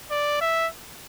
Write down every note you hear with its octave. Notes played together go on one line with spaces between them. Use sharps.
D5
E5